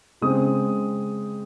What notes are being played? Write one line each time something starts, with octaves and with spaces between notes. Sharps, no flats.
C#3 G#3 C4 D#6